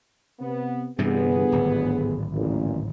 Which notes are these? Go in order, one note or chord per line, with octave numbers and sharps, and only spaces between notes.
C3 B3
G1 G2 C3 E3 B3 G#4
D1 G#1
A1 A#2